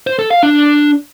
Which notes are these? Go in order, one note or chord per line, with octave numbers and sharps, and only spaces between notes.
C5
A4
F5
D4